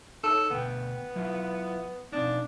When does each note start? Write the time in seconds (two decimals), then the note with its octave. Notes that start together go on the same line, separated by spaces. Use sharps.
0.23 D#4 A4 C#5
0.50 D2 B2 B3 G5
1.16 F#3 E4 F4
2.12 B2 C4 D4 D#4